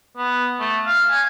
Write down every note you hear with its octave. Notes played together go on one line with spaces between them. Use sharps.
B3
A3
F5
G#5